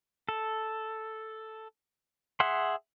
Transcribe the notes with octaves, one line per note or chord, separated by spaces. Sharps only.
A4
G#4 E5 F#5 C6